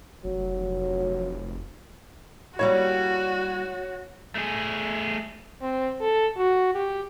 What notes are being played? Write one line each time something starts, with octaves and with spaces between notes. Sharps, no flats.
F1 F#3
G3 A#3 E4 F#4 C#5
A3 G#4
C4
A4
F#4
G4